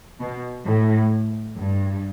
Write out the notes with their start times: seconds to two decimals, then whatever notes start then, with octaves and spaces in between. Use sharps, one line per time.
0.20 B2
0.66 A2
1.57 G2